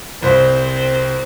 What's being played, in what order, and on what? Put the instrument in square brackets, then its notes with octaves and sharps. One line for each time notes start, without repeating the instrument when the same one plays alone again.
[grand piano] C2 C5 [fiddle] C4